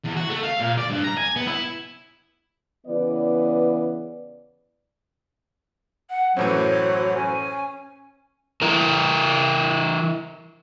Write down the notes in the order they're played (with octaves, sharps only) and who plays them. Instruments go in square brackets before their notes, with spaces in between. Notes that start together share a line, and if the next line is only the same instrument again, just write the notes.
[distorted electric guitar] E2
F#4
A3
F5
A#2
D5
G2
A#5
G#5
B3
E4
[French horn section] C#3 E3 B3 D5
[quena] F#5
[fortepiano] F#2 A2 E3 [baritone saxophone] F#3 [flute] C5 [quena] C#5
[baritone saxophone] C#4 [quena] G#5
[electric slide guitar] E3 E4 A#4